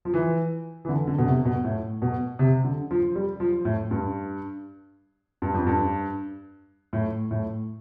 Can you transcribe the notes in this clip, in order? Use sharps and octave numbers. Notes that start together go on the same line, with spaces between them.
F3
E3
E3
D3
D3
B2
C3
B2
A2
B2
C3
D3
F3
G3
F3
A2
G2
G2
F2
G2
A2
A2